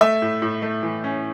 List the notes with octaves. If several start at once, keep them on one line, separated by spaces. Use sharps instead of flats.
A3 E5
A2
A2
A3
E3
C#4